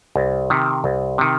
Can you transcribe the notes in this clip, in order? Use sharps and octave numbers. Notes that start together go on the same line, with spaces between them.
C2
C3 D#3
C2
C3 D#3